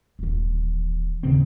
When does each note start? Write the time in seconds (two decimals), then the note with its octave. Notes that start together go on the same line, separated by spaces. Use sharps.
0.19 D#1 E3
1.23 D#2 C#3 C4